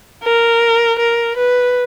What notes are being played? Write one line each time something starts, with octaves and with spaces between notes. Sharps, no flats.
A#4
A#4
B4